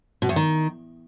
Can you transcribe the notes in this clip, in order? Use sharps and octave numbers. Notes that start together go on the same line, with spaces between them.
B2
E2
D#3